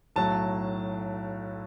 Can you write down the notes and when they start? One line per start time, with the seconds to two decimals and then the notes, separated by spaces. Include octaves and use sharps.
0.16 B1 A2 F#3 A5